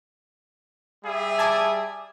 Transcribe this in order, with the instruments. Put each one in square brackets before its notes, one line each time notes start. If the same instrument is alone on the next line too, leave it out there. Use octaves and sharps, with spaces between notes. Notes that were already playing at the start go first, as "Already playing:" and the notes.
[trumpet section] G3 G#4 E5
[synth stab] G#5 A5 D6